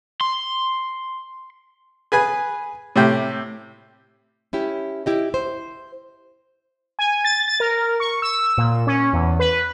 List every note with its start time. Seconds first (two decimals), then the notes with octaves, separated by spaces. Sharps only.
0.21 C6
2.12 G#4 B4 G#5
2.96 A2 C3 G4
4.53 C#4 E4 G4
5.06 E4 G4 D#5
5.34 C5
6.99 G#5
7.24 A6
7.48 A6
7.60 A#4
8.00 C#6
8.22 E6
8.58 A#2
8.87 C#4
9.13 E2
9.39 B4